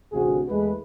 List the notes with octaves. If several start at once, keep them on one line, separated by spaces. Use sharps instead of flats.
A1 D2 C3 F#4 G#4
E2 G#3 A3 B4